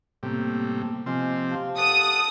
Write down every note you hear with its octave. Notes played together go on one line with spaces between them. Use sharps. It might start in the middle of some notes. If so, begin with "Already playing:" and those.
A2 C3 G3 A#3 B3
C3 F3 C4 D#5 G#5 D6
G4 F5 A5
A4 F#5 D#6